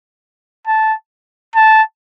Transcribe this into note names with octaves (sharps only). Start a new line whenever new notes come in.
A5
A5